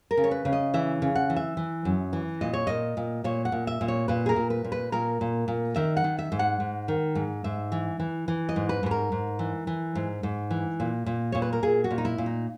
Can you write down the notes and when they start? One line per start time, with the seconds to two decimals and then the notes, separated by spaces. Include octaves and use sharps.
0.11 A#4
0.17 C#3
0.24 C#5
0.31 B4
0.45 C#3
0.53 D#5
0.74 E3 E5
1.02 C#3
1.15 F#5
1.30 E3
1.36 E5
1.57 E3
1.85 F#2
2.13 E3
2.41 A#2 D#5
2.53 C#5
2.67 A#2 D#5
2.97 A#2
3.24 A#2 C#5
3.45 F#5
3.52 A#2
3.67 E5
3.81 A#2
3.88 C#5
4.08 A#2 B4
4.26 G#4
4.29 A#4
4.36 A#2
4.50 B4
4.64 A#2
4.72 B4
4.92 A#2 A#4
5.21 A#2
5.48 A#2
5.76 D#3 E5
5.97 F#5
6.04 D#3
6.19 E5
6.32 G#2
6.39 F#5
6.60 G#2
6.88 D#3
7.15 G#2
7.44 G#2 E5
7.72 E3
8.00 E3
8.28 E3
8.49 D#5
8.56 G#2
8.69 B4
8.83 G#2 B4
8.91 A#4
9.12 G#2
9.39 E3
9.67 E3
9.95 G#2
10.23 G#2
10.51 E3
10.80 A#2
11.06 A#2
11.32 A#2 C#5
11.42 B4
11.53 A#4
11.63 A#2 G#4
11.84 F#4
11.90 A#2
11.98 D#4
12.05 E4
12.18 A#2
12.26 D#4